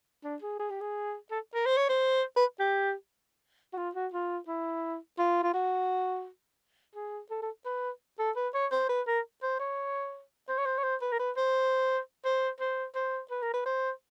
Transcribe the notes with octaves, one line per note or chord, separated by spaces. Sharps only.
D4
G#4
G#4
G4
G#4
A4
A#4
C5
C#5
C5
B4
G4
F#4
F4
F#4
F4
E4
F4
F4
F#4
G#4
A4
A4
B4
A4
B4
C#5
C5
B4
A#4
C5
C#5
C5
C#5
C5
C#5
C5
B4
A#4
B4
C5
C5
C5
C5
B4
A#4
B4
C5